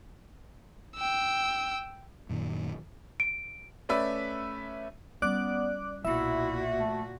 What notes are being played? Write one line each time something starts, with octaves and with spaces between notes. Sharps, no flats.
G5 E6
F#2 A#2 D#3
D7
A3 C#4 B4 D5 E5
G3 B3 C#4 D5 D6 F#6
B1 A#2 A#3 E4 F#4 E5
A3